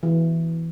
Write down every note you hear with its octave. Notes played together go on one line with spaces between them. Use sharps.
E3